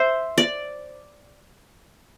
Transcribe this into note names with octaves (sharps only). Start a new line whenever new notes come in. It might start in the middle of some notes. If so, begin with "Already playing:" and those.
Already playing: C5 E5
D5